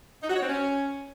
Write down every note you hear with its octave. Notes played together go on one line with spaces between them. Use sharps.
D#4
F#4
C#5
C4
C#4